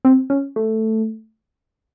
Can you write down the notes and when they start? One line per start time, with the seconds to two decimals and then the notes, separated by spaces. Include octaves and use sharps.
0.05 C4
0.30 C#4
0.56 A3